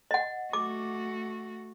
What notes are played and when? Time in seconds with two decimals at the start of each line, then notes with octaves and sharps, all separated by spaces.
0.11 D#5 F#5
0.53 A3 F#4 D6